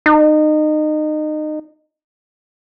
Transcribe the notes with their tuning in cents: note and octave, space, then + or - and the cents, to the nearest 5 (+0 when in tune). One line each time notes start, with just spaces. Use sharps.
D#4 -25